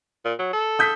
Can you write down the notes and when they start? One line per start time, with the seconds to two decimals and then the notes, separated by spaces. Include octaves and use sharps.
0.25 A#2
0.39 F#3
0.53 A4
0.79 D#6 G6 B6